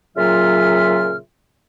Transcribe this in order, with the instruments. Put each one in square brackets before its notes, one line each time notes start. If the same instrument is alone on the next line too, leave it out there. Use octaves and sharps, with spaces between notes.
[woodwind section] A#2 C#3 F#3 F4 E5 F6